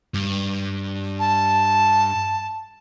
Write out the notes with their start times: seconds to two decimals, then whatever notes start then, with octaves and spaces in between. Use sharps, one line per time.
0.14 G2
1.20 A5